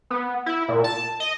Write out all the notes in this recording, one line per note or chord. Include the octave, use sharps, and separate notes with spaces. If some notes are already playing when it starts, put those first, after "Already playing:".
B3
E4
A#2
A5
D#5